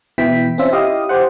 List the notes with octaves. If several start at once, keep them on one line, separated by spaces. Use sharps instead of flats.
B2 E3 E4 G5 B6
C4 C#4 F4 E5
E4 G4 D#5 F5 D#6
G4 C5 F#5